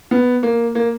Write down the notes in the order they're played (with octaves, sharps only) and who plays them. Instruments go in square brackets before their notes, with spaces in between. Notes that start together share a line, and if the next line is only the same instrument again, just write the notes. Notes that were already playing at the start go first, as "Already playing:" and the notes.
[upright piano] B3
A#3
A#3